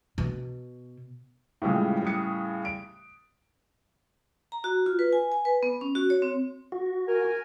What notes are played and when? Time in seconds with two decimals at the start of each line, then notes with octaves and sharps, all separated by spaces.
0.18 B2
1.62 A2 C#3 F3 G3 G#3
2.02 G3 D#6 C#7
2.65 D7
4.52 A#5
4.64 F#4
4.86 F4
4.99 B4
5.13 G#5
5.32 G#5
5.45 B4
5.63 B3
5.81 C#4
5.95 F#4
6.10 C#5
6.22 C4
6.72 F#4
7.08 A#4 G#5